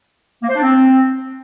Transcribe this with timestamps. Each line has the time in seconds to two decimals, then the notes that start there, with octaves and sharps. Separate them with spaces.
0.43 A#3
0.49 C5
0.56 D4
0.63 C4